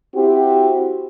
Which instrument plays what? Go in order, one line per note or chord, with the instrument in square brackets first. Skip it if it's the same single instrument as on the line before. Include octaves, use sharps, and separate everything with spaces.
[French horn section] C4 E4 F#4 G4